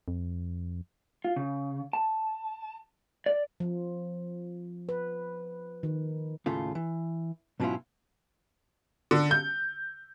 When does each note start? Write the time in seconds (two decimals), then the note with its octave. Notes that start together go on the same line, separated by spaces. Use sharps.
0.08 F2
1.25 F4
1.36 C#3
1.93 A5
3.26 D5
3.60 F3
4.89 B4
5.83 D#3
6.46 D#2 A2 C#3 A3 F4
6.75 E3
7.60 G#2 B2 F#3 C#4 E4 F4
9.11 D3
9.31 G6